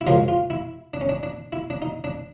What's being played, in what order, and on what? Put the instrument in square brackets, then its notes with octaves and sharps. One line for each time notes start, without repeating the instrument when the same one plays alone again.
[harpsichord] E4
F#2 C#3 F3 G#3 F4
F4
E4
D4
C#4
D4
D4
E4
D4
D#4
D4